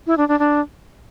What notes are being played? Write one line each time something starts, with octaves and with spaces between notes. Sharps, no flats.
E4
D4
D4
D4